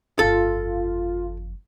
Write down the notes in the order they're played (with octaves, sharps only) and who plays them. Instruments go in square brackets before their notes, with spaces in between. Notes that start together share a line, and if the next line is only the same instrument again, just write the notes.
[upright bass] G1 F2 [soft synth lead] F4 [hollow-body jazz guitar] A4